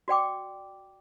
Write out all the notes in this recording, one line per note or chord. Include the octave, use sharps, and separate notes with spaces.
F#4 D5 G5 D6